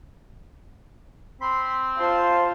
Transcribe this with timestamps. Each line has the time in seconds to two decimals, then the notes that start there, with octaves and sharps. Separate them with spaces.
1.41 C4 B5 C6
2.00 F4 C5 A5 C6